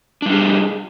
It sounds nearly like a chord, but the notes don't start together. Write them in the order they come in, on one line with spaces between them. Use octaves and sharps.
D4 G3 F4 G#4